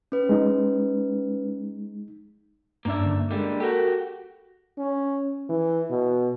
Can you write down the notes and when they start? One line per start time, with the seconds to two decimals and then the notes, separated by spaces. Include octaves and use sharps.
0.12 C#4 B4
0.29 G#3 D#4
2.85 G2 A#3 C#4 D4 E5
3.00 G2 D3
3.31 D3 G3 G#3 A#3
3.60 F#4 G4 A4 A#4
4.78 C#4
5.49 E3
5.90 B2